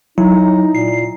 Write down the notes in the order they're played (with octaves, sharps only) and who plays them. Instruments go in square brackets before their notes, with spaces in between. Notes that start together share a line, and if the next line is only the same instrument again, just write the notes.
[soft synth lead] F#3 [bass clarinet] D#4 [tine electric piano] E4
[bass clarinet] A#2 [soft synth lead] C7